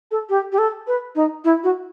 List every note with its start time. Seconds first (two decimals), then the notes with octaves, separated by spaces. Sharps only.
0.11 A4
0.29 G4
0.52 G4
0.58 A4
0.87 B4
1.15 D#4
1.45 E4
1.64 F#4